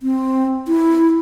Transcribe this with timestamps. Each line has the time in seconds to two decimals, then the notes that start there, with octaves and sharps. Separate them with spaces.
0.03 C4
0.68 E4